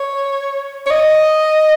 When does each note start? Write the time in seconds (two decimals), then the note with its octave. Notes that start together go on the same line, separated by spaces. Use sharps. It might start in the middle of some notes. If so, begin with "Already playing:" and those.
Already playing: C#5
0.86 C#5
0.90 D#5